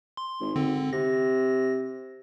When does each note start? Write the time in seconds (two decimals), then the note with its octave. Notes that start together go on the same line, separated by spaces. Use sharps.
0.17 C6
0.41 G#1
0.56 D3 C4
0.93 C3 A#6